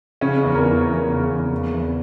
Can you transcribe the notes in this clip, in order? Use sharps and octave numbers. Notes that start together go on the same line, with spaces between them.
C#3 C#4
E2
A#4
E3
E2
C#3
E2
C#3
E2